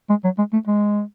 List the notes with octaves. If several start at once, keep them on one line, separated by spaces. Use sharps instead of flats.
G#3
F#3
G#3
A3
G#3